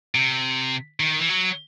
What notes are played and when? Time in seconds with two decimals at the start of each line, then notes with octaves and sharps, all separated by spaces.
0.15 C3
1.00 D#3
1.19 E3
1.29 F#3